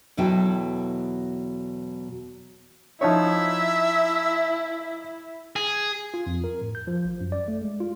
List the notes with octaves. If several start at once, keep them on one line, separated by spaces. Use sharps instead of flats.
E2 B2 F#3 E4 A4 G5
F3 D#4 E4 C#5 E5
G#4
F4
F2
A#4
A2
G6
F3
A1
F#2
D5
A3
G#3
F4